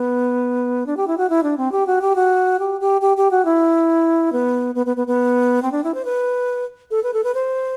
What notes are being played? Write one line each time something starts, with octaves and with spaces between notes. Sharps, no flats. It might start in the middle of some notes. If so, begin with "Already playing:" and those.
Already playing: B3
D4
G4
E4
F#4
E4
D4
C4
G4
F#4
G4
F#4
G4
G4
G4
G4
F#4
E4
B3
B3
B3
B3
B3
C4
D4
E4
C5
B4
A4
B4
A4
B4
C5